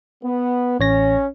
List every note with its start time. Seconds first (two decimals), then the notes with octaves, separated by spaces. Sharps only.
0.23 B3
0.80 A1 C#4 C#5 A#6